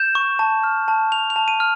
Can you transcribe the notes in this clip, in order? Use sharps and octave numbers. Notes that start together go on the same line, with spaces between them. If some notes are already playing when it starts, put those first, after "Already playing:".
Already playing: G6 E7
C#6
A5
F6
A5
A5 F7
F7
A5
D#7
F6